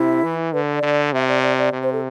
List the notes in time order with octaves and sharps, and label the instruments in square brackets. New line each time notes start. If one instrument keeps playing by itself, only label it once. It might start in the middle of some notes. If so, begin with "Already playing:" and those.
Already playing: [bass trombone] C3 [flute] E4
[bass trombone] E3
[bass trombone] D3 [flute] B4
[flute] D5
[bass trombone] D3
[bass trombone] C3 [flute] E5
[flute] D5
D5
D5
[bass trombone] C3
[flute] C5
A4